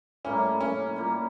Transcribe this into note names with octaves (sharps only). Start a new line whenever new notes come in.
A2 G3 A#3 C#4 E4
C#4
A#2 G3 A#3